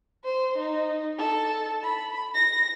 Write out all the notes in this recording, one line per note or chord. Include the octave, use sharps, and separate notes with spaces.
C5
D#4
A4
B5
A#6